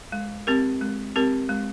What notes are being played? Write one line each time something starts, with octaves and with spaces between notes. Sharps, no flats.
G#3
C4 G4 A#4
G#3
C4 G4 A#4
G#3